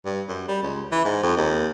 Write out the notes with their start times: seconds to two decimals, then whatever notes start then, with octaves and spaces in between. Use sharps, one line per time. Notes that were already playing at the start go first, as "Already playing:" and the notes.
0.05 G2
0.29 F#2
0.48 G3
0.63 C#2
0.92 E3
1.05 G#2
1.23 F2
1.37 D#2